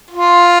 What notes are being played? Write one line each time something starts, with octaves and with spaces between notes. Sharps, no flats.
F4